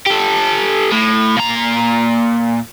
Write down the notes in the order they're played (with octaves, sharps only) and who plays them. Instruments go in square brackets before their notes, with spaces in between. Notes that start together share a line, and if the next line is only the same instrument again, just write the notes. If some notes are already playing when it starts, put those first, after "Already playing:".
[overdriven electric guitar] G4 A4
A2
A#2 A#5